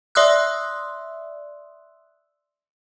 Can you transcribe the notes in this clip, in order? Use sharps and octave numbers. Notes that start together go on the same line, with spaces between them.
D5 E5 C6 D#6 E6 F#6